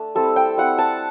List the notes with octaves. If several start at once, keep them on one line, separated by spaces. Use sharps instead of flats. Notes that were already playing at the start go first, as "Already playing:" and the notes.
Already playing: A3 D4
G3 C4 E4 A4
G5
G3 C4 E4 F#5
A5